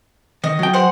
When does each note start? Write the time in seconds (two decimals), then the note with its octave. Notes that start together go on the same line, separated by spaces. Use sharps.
0.44 D#3 D#5
0.59 F#3 G5
0.74 G#4 C5 F#5